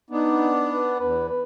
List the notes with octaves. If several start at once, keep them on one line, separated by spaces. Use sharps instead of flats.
B3 D4 D#4
B4
E2 B4
B4